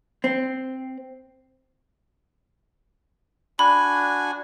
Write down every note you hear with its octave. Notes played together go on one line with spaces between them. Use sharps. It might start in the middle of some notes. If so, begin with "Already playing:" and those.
C4
D4 F#4 G#5 B5